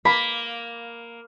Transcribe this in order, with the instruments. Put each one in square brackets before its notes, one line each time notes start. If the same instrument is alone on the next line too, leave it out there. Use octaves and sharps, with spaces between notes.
[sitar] A#3 [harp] B5